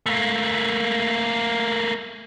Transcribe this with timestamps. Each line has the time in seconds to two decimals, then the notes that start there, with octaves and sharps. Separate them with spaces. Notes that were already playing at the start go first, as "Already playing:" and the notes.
0.06 A3 A#3